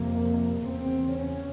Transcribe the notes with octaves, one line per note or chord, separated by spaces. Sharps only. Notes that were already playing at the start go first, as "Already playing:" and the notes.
Already playing: F2 C3 A#3
E2 C#3 C4
C#4